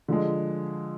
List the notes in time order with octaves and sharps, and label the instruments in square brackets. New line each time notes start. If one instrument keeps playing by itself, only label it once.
[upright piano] D3 F3 G#3